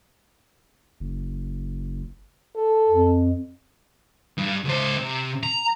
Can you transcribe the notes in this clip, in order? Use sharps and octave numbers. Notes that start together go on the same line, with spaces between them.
F#1
A4
F2
G2
C#2 C5
C3
A#5